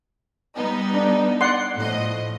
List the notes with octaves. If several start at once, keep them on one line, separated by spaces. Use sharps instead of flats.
G3 B3 D#4
D4
D5 F#5 C6
A2 F3 D#5